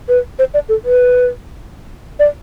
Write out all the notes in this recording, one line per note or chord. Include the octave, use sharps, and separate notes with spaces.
B4
C5
D5
A4
B4
D5